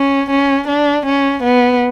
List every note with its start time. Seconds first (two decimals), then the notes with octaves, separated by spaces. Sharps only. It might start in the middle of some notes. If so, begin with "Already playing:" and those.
Already playing: C#4
0.30 C#4
0.68 D4
1.06 C#4
1.43 B3